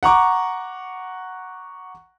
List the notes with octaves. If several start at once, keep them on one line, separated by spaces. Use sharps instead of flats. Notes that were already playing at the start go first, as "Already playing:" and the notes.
F#5 A#5 C#6 D6